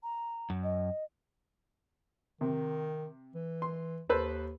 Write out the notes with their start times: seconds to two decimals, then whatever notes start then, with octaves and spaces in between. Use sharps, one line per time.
0.03 A#5
0.50 F#2
0.64 D#5
2.41 C3 D#3
3.35 E3
3.62 C6
4.09 D#2 A4 B4 C5